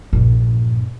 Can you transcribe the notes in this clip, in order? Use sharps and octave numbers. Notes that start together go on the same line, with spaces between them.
A#1 G2